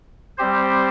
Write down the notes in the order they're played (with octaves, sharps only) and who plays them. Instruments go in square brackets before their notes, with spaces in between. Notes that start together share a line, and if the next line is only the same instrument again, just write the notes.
[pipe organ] G3 C4 G4 C5